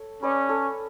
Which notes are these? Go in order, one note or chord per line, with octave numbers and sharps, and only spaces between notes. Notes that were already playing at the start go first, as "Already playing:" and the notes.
Already playing: A4 C#5
C#4 B4 D5
A4 C#5